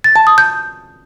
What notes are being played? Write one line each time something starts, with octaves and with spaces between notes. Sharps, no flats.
A6
A5
D#6
G6